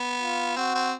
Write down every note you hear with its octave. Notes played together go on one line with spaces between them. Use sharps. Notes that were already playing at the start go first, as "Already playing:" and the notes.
Already playing: B3
F4
C4 F#4
C4